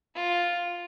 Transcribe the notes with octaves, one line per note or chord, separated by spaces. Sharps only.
F4